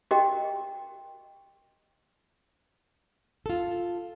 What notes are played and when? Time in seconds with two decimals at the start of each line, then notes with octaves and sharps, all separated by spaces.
0.11 F#4 G4 A#4 D#5 G5
3.46 F4 A4